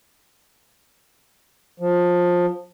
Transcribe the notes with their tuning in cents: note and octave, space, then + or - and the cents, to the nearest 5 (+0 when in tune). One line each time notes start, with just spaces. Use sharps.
F3 +20